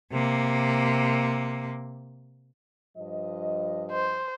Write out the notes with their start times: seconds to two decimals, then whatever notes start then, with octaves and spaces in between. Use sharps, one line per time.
0.12 C3 A#3
2.97 G2 F3 D#5
3.91 C5